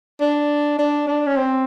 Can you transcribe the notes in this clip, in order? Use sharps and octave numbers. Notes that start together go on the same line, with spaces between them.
D4
D4
D4
C#4
C4